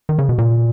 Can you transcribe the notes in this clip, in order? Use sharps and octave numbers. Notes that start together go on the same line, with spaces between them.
D#3
C#3
B2
A#2